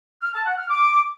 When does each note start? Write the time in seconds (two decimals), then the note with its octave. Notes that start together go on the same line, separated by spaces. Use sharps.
0.22 F6
0.34 A5
0.46 F#5
0.58 F6
0.69 D6